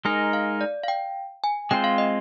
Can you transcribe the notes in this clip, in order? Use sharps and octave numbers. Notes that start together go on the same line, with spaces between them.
G#3 D#4 A#4 G#5
F5
D5
F5
G5
G#5
G#3 C4 F4 C5 G5
F5
D#5